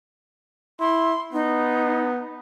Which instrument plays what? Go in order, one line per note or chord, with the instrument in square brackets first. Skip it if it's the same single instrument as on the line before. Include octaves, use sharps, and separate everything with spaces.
[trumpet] E4 [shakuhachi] C6
[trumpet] B3 [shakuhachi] D#4